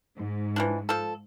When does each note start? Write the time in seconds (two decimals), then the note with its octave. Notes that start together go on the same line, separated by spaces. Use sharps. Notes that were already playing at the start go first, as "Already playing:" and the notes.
0.17 G#2
0.56 E3 F3 D4
0.89 F3 A4